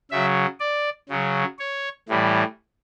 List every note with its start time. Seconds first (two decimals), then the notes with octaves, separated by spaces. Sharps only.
0.11 C#3 F#3 E5
0.60 D5
1.09 C#3 F#3
1.59 C#5
2.09 A2 E3 G3